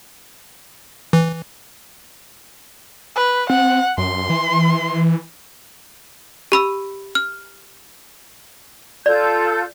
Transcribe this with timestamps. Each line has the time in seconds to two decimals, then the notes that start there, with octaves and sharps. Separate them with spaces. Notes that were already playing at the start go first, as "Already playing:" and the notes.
1.13 E3
3.16 B4
3.50 C4 F#5
3.98 F#2 C6
4.30 E3
6.52 G4 B5 E6
7.15 F6
9.06 F4 A4 D5 G6